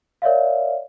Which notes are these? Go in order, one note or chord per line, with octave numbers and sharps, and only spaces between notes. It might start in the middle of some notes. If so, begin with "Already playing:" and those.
A#4 C#5 D5 E5 F5